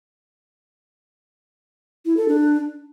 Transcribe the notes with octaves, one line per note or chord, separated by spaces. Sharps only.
E4
A4
D4